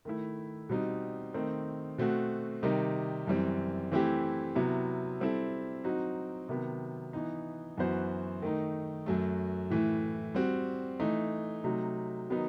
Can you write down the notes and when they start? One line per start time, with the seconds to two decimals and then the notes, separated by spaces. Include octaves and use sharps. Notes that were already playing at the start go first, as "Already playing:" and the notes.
0.05 D#3 A3 E4
0.69 B2 G3 C4 D#4
1.34 D#3 A3 C4 D#4
1.98 B2 A3 C4 F#4
2.63 C3 D#3 G3 D#4
3.27 F#2 E3 G3 C4
3.92 E3 A3 C4 E4 G4
4.55 C3 F#3 B3 E4
5.21 G3 C4 E4 A4
5.84 F#3 C4 D#4 F#4
6.49 C3 D#3 F#3 B3
7.13 E3 B3 D#4
7.77 F#2 E3 B3 F#4 C5
8.42 D#3 A3 D#4
9.06 F#2 F#3 A3
9.70 A2 E3 A3
10.35 G3 C4 F#4
11.00 E3 A3 D#4
11.64 C3 F#3 A3 D#4
12.30 D#3 F#3 B3 D#4